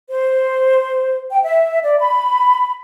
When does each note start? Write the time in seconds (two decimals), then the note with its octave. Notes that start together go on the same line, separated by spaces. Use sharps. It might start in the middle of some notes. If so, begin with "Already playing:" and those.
0.08 C5
1.31 G5
1.44 E5
1.83 D5
1.99 B5